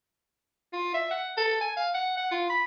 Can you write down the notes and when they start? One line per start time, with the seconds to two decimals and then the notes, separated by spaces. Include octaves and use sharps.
0.73 F4
0.94 E5
1.11 F#5
1.37 A4
1.61 G#5
1.76 F5
1.94 F#5
2.17 F#5
2.31 F4
2.50 B5